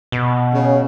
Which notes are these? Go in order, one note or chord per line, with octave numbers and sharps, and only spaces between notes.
B2
C#3